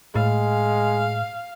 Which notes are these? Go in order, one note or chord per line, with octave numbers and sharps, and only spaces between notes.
A2 G#3 F5